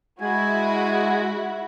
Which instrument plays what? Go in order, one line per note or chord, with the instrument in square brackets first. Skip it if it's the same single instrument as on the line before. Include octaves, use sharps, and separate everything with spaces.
[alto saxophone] G#3 [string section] E4 F#4 [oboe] G#5